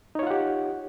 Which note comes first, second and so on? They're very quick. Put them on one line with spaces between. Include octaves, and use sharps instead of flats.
D#4 C#5 F4 F#5 G4